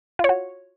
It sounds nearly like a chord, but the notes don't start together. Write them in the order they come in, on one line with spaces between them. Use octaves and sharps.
F4 C#5 F#4